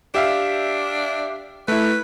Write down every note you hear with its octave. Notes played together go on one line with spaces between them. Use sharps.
D4 G4 E5 F5
A3 E4 B4